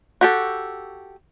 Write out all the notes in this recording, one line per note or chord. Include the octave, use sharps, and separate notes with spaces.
F#4 G4 A4